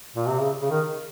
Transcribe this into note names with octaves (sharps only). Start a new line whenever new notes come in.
A#2
C3
C#3
C#3
D#3